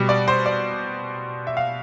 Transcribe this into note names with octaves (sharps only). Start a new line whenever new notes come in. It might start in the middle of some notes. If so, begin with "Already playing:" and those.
Already playing: B2 G3
D5
C5
D5
E5
F5